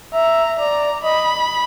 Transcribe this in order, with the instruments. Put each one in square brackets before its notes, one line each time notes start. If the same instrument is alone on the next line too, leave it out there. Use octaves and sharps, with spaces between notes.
[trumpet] E5 [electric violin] A#5
[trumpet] D5 [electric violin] A#5
[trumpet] D#5 [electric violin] B5